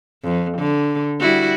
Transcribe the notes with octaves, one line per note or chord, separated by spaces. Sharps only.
F2
D3
G3 E4 F#4